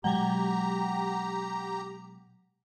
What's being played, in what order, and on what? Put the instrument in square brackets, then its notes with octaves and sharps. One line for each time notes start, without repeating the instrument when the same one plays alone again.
[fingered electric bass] B2 F#3 G#3 [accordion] G4 A#5 [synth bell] F#5 G5